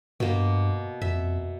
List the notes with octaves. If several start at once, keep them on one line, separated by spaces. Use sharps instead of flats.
G2 B2 A#3
F2 E5